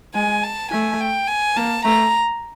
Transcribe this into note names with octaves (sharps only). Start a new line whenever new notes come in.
G#3 G#5
A5
A3 G#5
G5
G#5
A#3 A5
A3 A#5